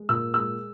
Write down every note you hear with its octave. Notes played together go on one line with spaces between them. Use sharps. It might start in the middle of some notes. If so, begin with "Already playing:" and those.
Already playing: G#3
A#2 E6
G#3 E6